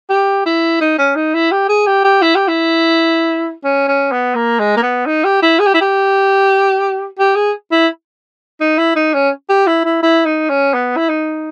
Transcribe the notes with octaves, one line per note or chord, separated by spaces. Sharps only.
G4
E4
D#4
C#4
D#4
E4
G4
G#4
G4
G4
E4
G4
E4
C#4
C#4
B3
A#3
G#3
A#3
B3
D#4
G4
E4
G#4
G4
E4
G4
G4
G#4
E4
D#4
E4
D#4
C#4
G4
E4
E4
E4
D#4
C#4
B3
E4
D#4